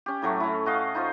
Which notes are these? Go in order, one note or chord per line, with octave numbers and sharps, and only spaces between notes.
C#4 G4
A2 F#3 A3 C#6
C#4 E4
F#4 D#5 F5
D#4 F4 C5